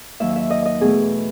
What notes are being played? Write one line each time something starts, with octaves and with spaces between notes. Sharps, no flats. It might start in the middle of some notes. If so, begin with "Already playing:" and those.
D#2 D#3 F#3 E5
E5
D#5
D#5
E2 B2 A3 G#4